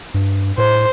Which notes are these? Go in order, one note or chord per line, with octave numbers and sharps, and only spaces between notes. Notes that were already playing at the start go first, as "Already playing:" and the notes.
G2
A2 C5